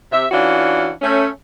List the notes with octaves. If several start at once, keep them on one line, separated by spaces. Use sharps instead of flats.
C3 E5
E3 C#4 D4 F4 F#4
A3 C#4